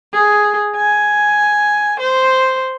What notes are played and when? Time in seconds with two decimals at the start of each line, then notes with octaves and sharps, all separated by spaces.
0.13 G#4
0.76 G#5
1.99 C5